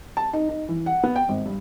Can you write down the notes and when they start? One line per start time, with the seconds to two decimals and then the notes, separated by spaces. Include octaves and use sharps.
0.17 A5
0.33 D#4
0.49 D#4
0.69 E3
0.86 F#5
1.03 B3
1.16 G5
1.29 G#1
1.46 G2